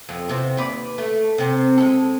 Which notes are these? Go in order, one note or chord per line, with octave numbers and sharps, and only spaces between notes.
F2
E2 C3 C4
D#2 B4 D5
A3
C3 C4
G#3 A4